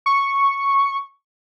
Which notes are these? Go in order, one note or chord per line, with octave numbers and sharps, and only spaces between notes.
C#6